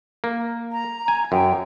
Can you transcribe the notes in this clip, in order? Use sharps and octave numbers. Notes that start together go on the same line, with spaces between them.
A#3
A#5
G#5
F#2 G5